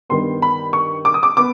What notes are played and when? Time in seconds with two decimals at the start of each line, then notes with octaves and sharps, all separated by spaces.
0.10 G2 D#3 G3 B3 C6
0.42 B5
0.73 C#6
1.05 D6
1.14 D#6
1.23 D6
1.37 B3 D6